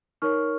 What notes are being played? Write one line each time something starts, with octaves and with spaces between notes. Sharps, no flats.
D#4 A#4 C#5 C#6 F6